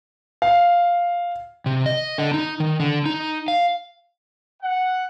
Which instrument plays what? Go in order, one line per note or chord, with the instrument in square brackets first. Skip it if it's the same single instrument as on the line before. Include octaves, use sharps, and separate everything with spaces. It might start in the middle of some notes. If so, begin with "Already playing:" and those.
[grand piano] F5
[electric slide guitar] C3
D#5
D3
D#4
D#3
D3
D#4
F5
[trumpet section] F#5